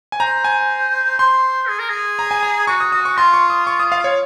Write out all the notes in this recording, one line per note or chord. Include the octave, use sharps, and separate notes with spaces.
G#5
C5 A#5
G#5
C5 C6
G#4
A#4
G#4
A#5
G#5
A#5
F#4 C#6
D#6
F#4 D#6
C#6
F4 C6
C#6
D#6
C#6
D#6
F5
C#5